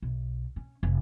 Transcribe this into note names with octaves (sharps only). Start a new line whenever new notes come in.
B1
C#4
F1